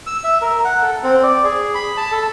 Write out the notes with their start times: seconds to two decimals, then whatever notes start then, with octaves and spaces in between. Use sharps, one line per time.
0.07 E6
0.24 E5
0.41 A#4
0.65 F#5
0.83 A4
1.03 C4
1.23 D5
1.44 G#4
1.74 B5
1.97 A5
2.12 A4